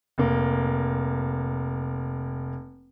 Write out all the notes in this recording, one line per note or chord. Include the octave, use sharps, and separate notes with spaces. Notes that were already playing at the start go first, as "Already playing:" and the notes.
F1 A#3